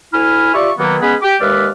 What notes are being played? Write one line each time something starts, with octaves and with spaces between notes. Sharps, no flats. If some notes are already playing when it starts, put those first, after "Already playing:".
D2 E4 G#5 B5 F6
F4 G4 D5 E5 C#6
B2 D#3 F#3 A#3 B3
G#3 B3 C#4 G#4 B4 B5
G4
D#2 G#3 B4 D5 E5 F5